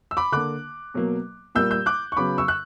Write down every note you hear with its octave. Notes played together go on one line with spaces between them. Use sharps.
E6
B5 D6
D3 A#3 D6 F#6
B2 F#3 A#3
A#2 G3 A#3 E6 G6
E6 G6
D6 F#6
C#6
C#3 F#3 B3 B5 D6
C#6 E6
F#6